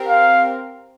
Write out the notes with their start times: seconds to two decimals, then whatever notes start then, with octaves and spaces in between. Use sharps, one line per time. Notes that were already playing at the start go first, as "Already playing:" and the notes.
Already playing: C4 G4 A#4
0.08 F5